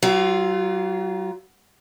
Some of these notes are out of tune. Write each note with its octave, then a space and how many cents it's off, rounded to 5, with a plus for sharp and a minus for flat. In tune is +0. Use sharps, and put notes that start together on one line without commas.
F#3 +35 F4 +0